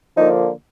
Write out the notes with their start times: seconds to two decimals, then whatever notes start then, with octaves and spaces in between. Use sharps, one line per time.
0.17 D3 F3 A#3 D#4